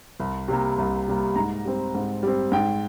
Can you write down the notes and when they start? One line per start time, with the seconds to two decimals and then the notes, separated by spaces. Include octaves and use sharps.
0.20 C2
0.48 C3 G3 A#3
0.78 C2
1.07 C3 G3 A#3
1.36 G#2 A#5
1.65 G3 C4
1.95 G#2
2.23 G3 C4
2.52 G#2 G5